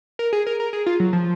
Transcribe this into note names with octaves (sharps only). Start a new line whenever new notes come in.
A#4
G#4
A#4
A#4
G#4
F4
F#3
F3